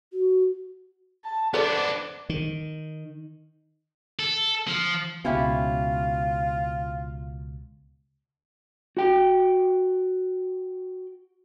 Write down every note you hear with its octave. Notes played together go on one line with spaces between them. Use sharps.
F#4
A5
B3 D4 A4 C5 D5 D6
D#3
A4
F3
C#2 B2 C#4 E4 F4 G4
F#4 G5